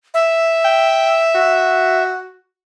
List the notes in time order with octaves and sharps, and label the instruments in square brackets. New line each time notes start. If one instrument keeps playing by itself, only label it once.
[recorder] E5
[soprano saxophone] G5
F#4